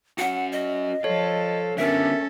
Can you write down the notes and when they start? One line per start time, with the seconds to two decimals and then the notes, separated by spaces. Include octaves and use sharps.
0.18 C#4 F#4 F#5
0.52 D#5
1.04 F3 A4 C#5 F5
1.78 D3 B3 C#4 A4 A#4 E5